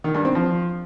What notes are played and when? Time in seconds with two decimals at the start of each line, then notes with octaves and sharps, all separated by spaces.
0.04 D#3
0.15 G2
0.25 C4
0.35 F3